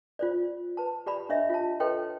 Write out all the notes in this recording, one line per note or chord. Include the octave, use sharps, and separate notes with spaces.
F4 C5 D5
B4 A5
G4 D5 A#5 B5
D4 C#5 D#5 E5
F4 A5
A4 B4 C#5 D#5 G5 C6